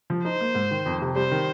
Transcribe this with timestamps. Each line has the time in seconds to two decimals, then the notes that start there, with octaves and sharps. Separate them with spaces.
0.10 F3
0.25 D#4 C5
0.40 A#3
0.55 G#2
0.71 D#3
0.86 F2
1.02 C3
1.16 G3 C5
1.31 D#3